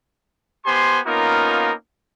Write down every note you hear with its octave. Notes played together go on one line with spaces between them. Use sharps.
B3 G4 C5 G#5 C6
A#3 B3 C#4 D#4 F4 A#4